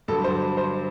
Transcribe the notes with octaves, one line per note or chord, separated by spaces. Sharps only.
G2 D3 F#3 A4
C5
C5